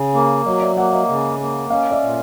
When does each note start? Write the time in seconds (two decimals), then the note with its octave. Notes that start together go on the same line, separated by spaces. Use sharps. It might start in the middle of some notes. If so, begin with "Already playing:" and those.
Already playing: C#3
0.14 A#3
0.45 F#3 C#5 D#5
0.61 D5 E5
0.77 A#3 E5 F#5
0.93 D#5 F5
1.08 C#3
1.40 A#3
1.70 C#4 D#5 F5
1.91 D5 E5
2.02 A#2